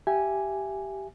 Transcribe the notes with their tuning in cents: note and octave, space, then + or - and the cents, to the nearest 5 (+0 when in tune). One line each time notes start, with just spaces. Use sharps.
G4 -10 E5 +20 G#5 +0